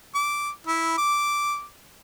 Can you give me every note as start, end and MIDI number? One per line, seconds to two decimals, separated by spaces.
0.15 0.50 86
0.67 0.94 64
0.98 1.64 86